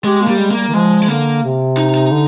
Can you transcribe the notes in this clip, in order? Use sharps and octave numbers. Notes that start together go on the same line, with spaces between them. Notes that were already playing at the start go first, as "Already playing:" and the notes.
G#3 G4
A#3
G3
G#3
A#3
G3
D#3
F3 G#3
G#3
D3 A#3
C3
D#4
D#4
D3